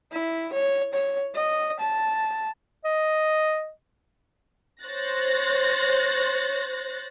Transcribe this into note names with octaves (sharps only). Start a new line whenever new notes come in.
E4
C#5
C#5
D#5
A5
D#5
C5 C#5 F#6 A6 A#6